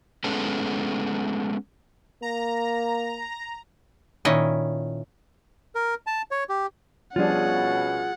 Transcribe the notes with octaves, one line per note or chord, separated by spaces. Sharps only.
G#3 A3 B3 C#4 A4
A#3 A#5
A#2 D#3 C#4 E4 D#5
A#4
A5
C#5
G4
B2 F3 G3 C#4 D4 F4 G#4 F#5